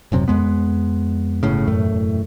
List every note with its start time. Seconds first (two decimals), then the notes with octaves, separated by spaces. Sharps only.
0.12 D#1 F#2 C3
0.28 F2 G#3 B3
1.43 G1 A2 C#3
1.67 E1 F#2 A2 A3